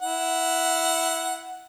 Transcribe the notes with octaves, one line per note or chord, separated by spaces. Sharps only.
E4 F#5